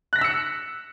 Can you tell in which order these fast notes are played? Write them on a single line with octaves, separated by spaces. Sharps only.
F#6 A#6 B6 E6 C#7